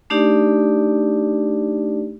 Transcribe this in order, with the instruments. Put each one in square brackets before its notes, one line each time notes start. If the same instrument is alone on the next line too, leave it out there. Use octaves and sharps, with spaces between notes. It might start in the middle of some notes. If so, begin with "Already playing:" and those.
[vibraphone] A3 D4 D#4 G4 D5